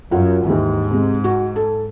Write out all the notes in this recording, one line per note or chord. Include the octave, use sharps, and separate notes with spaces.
F#2 F#3 F4 F#5
D#2 G#2 E3
C3 G#3
F#4
A4